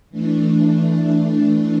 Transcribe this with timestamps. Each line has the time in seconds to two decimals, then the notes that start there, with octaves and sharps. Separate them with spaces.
0.10 E3 A3 D4